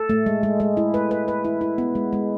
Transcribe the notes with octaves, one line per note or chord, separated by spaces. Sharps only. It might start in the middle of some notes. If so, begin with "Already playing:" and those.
Already playing: A4
A3
G#3
G#3
G#3
E4
B4
B4
B4
E4
E4
B3
G#3
G#3